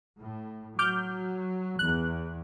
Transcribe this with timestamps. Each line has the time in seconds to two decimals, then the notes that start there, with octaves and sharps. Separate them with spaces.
0.18 A2
0.79 F#3 D6 F6 G6
1.79 E2 F#6